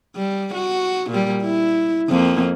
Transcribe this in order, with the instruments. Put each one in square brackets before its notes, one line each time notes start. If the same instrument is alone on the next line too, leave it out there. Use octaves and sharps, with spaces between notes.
[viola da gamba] G3
F#4
A#2 G3
E4
F2 A#3